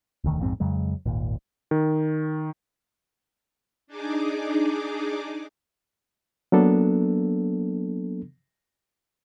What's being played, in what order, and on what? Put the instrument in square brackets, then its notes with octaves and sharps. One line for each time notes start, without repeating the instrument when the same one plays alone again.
[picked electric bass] E1 D2 D#3
A#1 F2 G#2 C4
F2 C#3 F#3 G#3
G#1 D#2 A#2
[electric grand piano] D#3
[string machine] D4 D#4 G#4 D6
[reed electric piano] F#3 A#3 B3 D4 A4